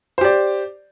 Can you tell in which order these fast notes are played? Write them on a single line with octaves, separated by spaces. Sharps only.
C5 G4 D5